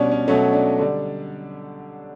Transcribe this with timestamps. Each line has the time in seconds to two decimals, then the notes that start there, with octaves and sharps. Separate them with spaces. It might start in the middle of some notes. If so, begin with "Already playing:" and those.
Already playing: B2 G3 C#4 D4
0.11 C#4
0.28 B2 F#3 A3 C#4
0.53 D4
0.79 D3 G3